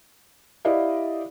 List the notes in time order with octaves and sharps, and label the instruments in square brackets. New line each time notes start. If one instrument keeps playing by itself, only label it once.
[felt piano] E4 G4 D5 D#5 F5